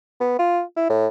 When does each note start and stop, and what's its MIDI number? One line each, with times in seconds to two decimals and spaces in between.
0.20 0.37 59
0.39 0.61 65
0.76 0.88 64
0.89 1.07 45